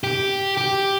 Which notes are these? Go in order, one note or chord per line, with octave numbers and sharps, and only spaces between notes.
G4
G4